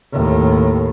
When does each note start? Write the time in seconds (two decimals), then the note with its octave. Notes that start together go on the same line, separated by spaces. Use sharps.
0.12 D#2 A2